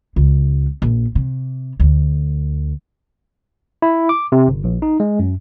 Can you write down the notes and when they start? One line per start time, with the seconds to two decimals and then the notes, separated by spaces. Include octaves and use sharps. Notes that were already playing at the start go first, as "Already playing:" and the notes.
0.16 C#2
0.82 A#1
1.15 C3
1.80 D2
3.82 E4
4.09 D6
4.32 C3
4.48 G1
4.64 A#1
4.82 D#4
5.00 G#3
5.19 F#2